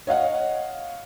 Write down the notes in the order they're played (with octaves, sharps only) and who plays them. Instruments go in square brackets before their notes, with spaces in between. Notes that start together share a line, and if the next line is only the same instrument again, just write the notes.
[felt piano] C#5 D#5 F5 F#5